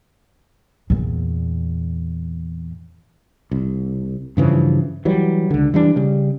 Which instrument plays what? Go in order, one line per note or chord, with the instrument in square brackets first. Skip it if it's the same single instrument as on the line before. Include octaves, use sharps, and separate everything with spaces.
[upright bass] E2 A#2
[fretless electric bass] C2
G2 C#3 E3 F3
E3 F#3 G3
C#2 D3
E3 G3 D4
C#3 G3